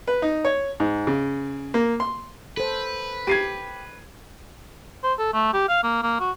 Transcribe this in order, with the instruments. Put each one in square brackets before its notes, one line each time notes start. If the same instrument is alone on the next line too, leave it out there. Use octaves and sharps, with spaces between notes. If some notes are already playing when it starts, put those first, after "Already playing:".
[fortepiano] B4
D#4
C#5
G#2
C#3
A#3
C6
[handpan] A4 C5 [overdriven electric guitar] B4
[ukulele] G4 [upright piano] G#6 C7 D#7
[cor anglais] C5
A4
A3
G4
F5
A#3
A#3
F#4